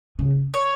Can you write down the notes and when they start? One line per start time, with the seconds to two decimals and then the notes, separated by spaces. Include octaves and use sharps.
0.19 C#3
0.54 C#5